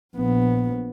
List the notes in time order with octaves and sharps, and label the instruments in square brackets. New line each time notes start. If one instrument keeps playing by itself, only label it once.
[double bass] A#1 B3